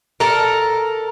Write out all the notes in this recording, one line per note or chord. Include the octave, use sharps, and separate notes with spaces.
A4 A#4